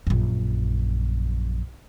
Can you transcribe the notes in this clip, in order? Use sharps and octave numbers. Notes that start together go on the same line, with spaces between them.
A#1 F#2